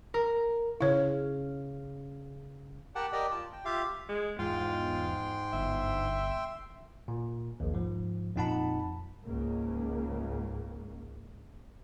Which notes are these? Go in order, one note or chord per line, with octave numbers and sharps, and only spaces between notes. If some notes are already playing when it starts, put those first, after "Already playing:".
A#4
C#3 E4 C#5 F5
G4 A#4 F#5 G5 A5
G4 A#4 D5 D#5 G5
F4 A5
G5
F4 G4 E5 F5
G#3
E2 G#2 F4 G5 C6
G1 E5
A#2
A#1 D#2
G#2 F3
F2 A#2 D#4 F#5 A5 B5
C#2 G#2 C#3 A#3